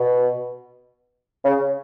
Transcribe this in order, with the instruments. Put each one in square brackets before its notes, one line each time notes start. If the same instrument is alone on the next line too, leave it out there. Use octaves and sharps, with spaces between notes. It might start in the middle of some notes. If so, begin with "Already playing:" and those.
Already playing: [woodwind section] B2
C#3